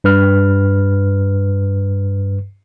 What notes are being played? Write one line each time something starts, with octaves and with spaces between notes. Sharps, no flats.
G2 B4 F6